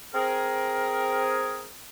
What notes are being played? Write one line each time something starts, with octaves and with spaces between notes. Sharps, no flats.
C4 G#4 A#4